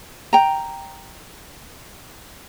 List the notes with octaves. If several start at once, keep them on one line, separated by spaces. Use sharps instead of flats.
G5 A#5